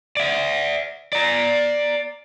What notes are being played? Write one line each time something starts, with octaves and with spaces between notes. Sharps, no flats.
D5 E5
D5 A#5